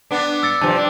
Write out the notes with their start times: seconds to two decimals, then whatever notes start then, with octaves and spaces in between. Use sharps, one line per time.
0.11 B3 D4
0.43 E6 A6 C#7
0.61 G2 C3 F3 A5
0.76 D4